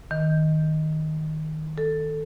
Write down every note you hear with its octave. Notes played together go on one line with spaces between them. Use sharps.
D#3
A4